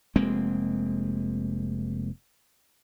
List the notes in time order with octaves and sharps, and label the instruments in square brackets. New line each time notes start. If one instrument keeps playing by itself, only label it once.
[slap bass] F1 G#3 A#3 C4